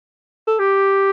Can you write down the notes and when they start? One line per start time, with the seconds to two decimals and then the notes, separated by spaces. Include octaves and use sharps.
0.47 A4
0.59 G4